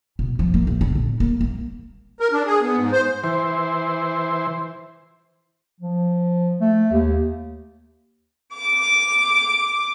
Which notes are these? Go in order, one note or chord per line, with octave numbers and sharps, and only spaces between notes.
B2
F3
A#3
A#1
D3
A#2
A#3
A#3
A#4
D4
G#4
B3
G#2
C5
E3 C5
F3
A3
D#2
D6